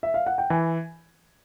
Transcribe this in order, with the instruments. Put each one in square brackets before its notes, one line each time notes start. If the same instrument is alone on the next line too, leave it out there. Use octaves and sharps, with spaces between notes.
[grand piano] E5
F5
F#5
G5
[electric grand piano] E3 [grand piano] G#5